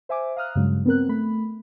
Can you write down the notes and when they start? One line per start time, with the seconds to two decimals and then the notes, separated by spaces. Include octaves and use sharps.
0.09 C5 E5 G#5 D6
0.36 F5 A#5 D#6 F6 F#6
0.55 G2 C#3 F#3 G#3
0.85 B3 C4 A#4 F#6
1.09 A3 B5